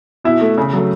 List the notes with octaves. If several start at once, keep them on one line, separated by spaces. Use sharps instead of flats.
B2 E4 E5
A3
C#3
F#3 A3